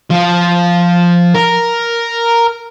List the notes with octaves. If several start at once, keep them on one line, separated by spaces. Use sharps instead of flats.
F3
A#4